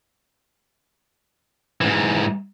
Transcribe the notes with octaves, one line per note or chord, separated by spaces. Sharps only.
G#2 E3